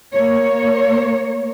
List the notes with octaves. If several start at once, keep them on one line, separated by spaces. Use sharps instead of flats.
A#3 C#5